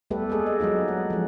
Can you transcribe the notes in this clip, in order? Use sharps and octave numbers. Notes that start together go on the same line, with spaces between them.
G3 A3 B3 G4 A4 B4
G#3 A#3 G#4 A4
D#5
F#3 G#3 D#4 F4
F#5
F3 G#3